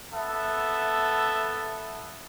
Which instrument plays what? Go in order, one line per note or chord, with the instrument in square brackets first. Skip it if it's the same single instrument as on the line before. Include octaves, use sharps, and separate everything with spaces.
[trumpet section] B3 A4 E5